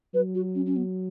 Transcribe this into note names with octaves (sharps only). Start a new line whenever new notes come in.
F#3 B4
F#4
C#4
C#4
B3